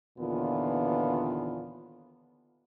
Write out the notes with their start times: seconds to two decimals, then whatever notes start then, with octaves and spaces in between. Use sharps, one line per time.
0.19 D#2 A#2 D3 E3 B3 F4